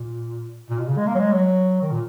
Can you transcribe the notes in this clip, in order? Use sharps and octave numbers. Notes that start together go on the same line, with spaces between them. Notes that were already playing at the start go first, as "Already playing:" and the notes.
Already playing: A#2
A#2
B2
C#3
G#3
A#3
F#3
G#3
F#3
D#3
A#2